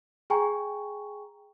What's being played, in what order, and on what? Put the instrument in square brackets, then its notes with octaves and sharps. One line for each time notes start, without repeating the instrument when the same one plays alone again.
[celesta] G#4 G5 G#5 A#5 C#6